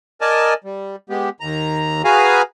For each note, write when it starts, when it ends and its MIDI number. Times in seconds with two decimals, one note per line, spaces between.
0.21 0.54 70
0.21 0.54 74
0.21 0.54 75
0.21 0.54 80
0.21 0.54 81
0.64 0.96 55
1.10 1.29 56
1.10 1.29 59
1.10 1.29 67
1.40 2.02 39
1.40 2.02 82
2.05 2.42 66
2.05 2.42 68
2.05 2.42 71
2.05 2.42 77
2.05 2.42 80
2.05 2.42 82